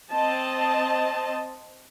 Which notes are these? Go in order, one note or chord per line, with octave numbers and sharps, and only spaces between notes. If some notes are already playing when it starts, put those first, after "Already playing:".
C4 D#5 A5